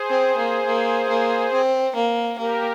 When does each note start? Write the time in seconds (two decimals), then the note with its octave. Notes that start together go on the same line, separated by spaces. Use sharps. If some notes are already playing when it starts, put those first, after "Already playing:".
Already playing: G#4 C5
0.10 C4
0.37 A#3
0.66 A#3
1.09 A#3
1.52 C4
1.96 A#3
2.38 A#3 G4 A#4